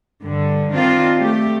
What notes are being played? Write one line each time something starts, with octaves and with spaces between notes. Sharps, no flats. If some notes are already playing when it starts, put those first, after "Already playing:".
G2 D3
D#3 C4 D4 F4
A3 G4